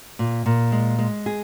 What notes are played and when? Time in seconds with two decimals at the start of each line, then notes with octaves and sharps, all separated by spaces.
0.19 A#2
0.46 A#2
0.72 G#3
0.98 G#3
1.26 G#4